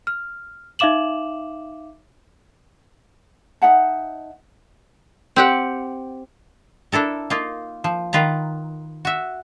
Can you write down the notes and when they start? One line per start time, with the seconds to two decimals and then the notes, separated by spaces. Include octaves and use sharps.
0.07 F6
0.79 D#4 E5 F5 D6 E7 F#7
3.62 D#4 E5 F#5 A5
5.36 C4 G4 F#5
6.92 D4 E4 A4 A#4
7.30 A#3 D#4 F4
7.84 F3
8.13 D#3 F4 B4 A#5
9.05 F#4 E5